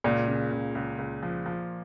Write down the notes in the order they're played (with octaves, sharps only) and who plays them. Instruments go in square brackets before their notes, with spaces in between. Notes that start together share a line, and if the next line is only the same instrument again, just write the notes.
[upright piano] C#2 [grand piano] A#2
[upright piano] C#3
C#2
C#2
C#2
F3
F3